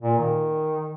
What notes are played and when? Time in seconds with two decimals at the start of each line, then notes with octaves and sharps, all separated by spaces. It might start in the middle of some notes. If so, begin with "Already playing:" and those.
0.03 A#2
0.18 D#3